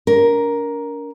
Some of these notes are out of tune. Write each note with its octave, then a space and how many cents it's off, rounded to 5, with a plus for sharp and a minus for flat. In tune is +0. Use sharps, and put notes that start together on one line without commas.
D4 -45 A#4 +5